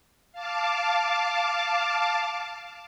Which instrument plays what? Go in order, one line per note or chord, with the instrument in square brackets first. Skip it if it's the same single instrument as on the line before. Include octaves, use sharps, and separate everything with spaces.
[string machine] F5 A5 D6